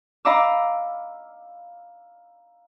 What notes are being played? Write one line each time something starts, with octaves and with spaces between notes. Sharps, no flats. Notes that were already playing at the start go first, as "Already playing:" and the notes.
D#5 F5 A#5 B5 D6 E6